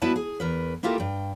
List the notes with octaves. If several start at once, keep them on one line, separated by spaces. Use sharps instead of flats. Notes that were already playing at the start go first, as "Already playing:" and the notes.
G3 B3 E4 F#4 B4 A5
G#4
E2 A#4 B4
A#3 E4 F4 G4 A4 A#4
G2 G5